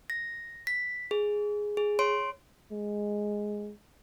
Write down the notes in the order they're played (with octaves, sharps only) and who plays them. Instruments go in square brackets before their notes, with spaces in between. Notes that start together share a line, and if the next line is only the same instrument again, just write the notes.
[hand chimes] A#6
B6
G#4
G#4
C#5 C6 D7
[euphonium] G#3